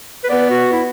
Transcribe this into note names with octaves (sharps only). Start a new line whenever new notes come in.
B4
B3 D5
F#4
E4